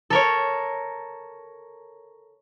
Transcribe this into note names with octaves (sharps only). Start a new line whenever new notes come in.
A4 A#4 C#5